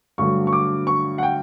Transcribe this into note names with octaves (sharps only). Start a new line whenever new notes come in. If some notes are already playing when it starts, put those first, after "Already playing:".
G2 D3 F#3 A3 C#6
C#6
D6
C#6
F#5
G5